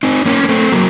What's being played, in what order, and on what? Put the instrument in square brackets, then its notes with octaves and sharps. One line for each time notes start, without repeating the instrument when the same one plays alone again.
[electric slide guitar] C4 D#4
A#3 C#4
A#3
A3 C4
F#3 A#3